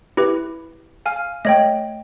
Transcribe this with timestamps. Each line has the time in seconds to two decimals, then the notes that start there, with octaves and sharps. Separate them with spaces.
0.17 E4 G4 B4
1.06 F5 G#5 F6
1.45 A3 C#5 D#5 G5